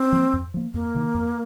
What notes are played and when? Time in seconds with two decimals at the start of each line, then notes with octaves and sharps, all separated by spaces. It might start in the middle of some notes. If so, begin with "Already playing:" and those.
Already playing: C4
0.12 F3 A#3
0.33 F2
0.54 F3 A#3
0.74 F2 A#3
0.94 C3 D#3
1.15 F2